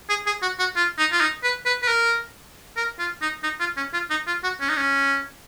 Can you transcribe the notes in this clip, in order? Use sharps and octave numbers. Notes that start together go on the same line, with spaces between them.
G#4
G#4
F#4
F#4
F4
D#4
F4
D#4
B4
B4
B4
A#4
A#4
F4
D#4
D#4
F4
C#4
F4
D#4
F4
F#4
C#4
D#4
C#4